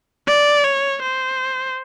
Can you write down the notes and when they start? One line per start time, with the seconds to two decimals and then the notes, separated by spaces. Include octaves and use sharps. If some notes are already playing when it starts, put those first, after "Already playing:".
0.27 D5
0.64 C#5
1.02 C5